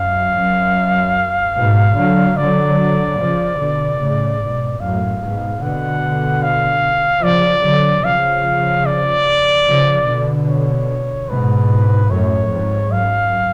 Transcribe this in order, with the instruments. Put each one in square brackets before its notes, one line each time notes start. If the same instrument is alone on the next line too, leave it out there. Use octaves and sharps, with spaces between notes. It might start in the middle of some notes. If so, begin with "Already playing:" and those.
Already playing: [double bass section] F#2 [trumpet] F5
[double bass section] F#2
G#2 B2
D3 F#3
[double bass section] D3 F#3 [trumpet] D5
[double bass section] C#3 F3
B2 D3
A2 C#3
G#2 B2
[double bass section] F#2 A2 [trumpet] F5
[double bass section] G#2 B2
[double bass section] B2 D3 [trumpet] F#5
[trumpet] F5
[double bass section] C#3 F3 [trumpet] D5
[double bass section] D3 F#3
[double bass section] C#3 F3 [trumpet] F5
[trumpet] D5
[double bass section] C#3 F3
B2 D3
[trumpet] C#5
[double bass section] G#2 B2 [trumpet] B4
[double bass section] F#2 A2 [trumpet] C#5
[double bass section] F2 G#2
[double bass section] F#2 [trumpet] F5